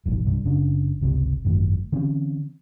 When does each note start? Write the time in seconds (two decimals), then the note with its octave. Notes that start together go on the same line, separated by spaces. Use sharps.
0.06 E1 A#1 G#2
0.24 C2 G2
0.44 F#1 C#3 D4
1.01 G1 C#2 C3
1.45 G#1 F#2 D#3 A3
1.92 D3 E3 C4 C#4